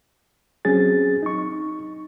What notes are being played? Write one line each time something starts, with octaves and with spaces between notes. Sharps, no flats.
F#3 C4 C#4 G#4 A6
D#4 C#6